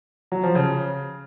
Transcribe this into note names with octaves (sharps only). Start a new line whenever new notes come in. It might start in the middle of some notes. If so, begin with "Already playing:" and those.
F#3
F3
C#3